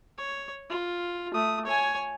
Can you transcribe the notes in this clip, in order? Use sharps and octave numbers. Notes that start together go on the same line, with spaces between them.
C#5
F4
A3 D#6
C#5 G#5